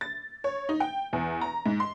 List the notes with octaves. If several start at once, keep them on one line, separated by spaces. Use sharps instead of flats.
A6
C#5
D#4
G5
E2
A#5
G#2
C6